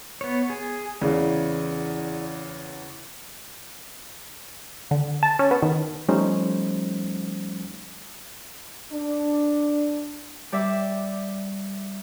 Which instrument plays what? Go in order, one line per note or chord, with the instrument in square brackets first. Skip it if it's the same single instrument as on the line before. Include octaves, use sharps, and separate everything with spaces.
[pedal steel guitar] B3 C#5
G#4
[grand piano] E2 C#3 [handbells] E4 G#4 D5
[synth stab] D3
A5
C#4
B3
D#3
[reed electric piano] F3 G3 A3 C#4 D#4 C5
[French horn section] D4
[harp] G3 D5 E5